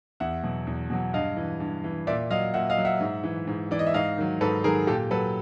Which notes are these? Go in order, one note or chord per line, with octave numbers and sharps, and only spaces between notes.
E2 E5 F#5
B2 F#3
E2
B2 F#3
G2 D#5 F5
E3
G2
E3
A#2 D5 E5
F#3 D#5 F5
A#2 E5 F#5
D#5 F5
F#3
E5 F#5
G#2
E3
G#2
E3 D5
D#5
E5
G#2 D#5 F5
D#3 F#3
G#2 A4 B4
D#3 F#3 G#4 A#4
A#2 G4 A4
F#3 A4 B4